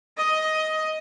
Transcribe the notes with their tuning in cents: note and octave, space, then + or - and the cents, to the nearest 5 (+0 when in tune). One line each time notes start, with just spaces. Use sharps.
D#5 +10